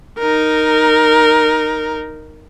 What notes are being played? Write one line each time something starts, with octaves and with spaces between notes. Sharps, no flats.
D#4 A#4